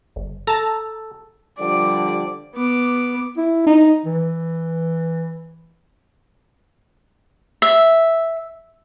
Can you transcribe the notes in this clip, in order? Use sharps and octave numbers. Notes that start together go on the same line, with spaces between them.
G1
A4 A5 A#5
D3 F3 G3 D5
B3 D6
E4
D#4
E3
E5